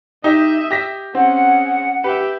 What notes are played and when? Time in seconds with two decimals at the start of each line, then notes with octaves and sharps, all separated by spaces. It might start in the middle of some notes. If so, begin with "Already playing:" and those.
0.24 D#4 G4 D#5 E5
0.71 G4 A#6 B6
1.15 C4 C#4 G#4 F#5
2.04 G4 B4 E5